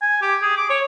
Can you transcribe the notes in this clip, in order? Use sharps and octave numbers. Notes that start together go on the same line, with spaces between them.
G#5
G4
G#4
D6
C#5